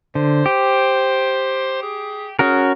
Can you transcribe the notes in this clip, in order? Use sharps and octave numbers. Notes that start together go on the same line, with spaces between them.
D3 C5
G4
G#4
C#4 F#4 G#4 A#4